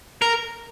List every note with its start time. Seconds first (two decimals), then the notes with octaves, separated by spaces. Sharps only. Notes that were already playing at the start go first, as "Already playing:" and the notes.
0.22 A#4